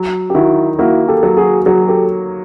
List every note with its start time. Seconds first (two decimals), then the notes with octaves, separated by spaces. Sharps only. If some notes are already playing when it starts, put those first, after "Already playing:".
Already playing: F#3
0.30 G4
0.34 D#3 E4 F#4
0.79 A#3 E4 F#4
1.08 G4 A4
1.23 F#3
1.37 F#4 G#4
1.66 F#3 F#4 G#4
1.88 G4 A4